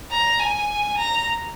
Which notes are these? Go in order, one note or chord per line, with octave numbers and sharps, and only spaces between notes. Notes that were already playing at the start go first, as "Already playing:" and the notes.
A#5
G#5
A#5